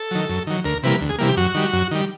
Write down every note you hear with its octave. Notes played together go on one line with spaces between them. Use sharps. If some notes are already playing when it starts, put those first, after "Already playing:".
Already playing: A4
D#3 F#3
F#2
D#3 F#3
D2 A#4
C3 E3 G3 A#3 B4
D2
G#4
C3 E3 G3 A#3
G4
F#2 F#4
D#3 G3
F#2
D#3 G3